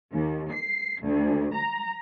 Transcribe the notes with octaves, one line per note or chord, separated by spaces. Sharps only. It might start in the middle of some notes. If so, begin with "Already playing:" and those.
D#2
C7
D2
A#5